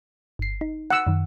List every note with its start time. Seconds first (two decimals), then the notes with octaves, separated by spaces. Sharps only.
0.39 G1 C7
0.61 D#4
0.90 F#5 E6
1.07 F#2 D#3